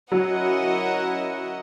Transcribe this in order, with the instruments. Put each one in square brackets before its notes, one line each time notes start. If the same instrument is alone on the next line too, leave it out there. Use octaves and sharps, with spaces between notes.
[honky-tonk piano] F#3 [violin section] C#4 E4 A#4 D#5 F#5